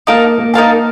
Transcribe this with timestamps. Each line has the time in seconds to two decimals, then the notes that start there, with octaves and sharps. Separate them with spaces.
0.07 A#3 D#4 A#4 F5 A5
0.38 A#3
0.54 A#3 D#4 A#4 F5 A5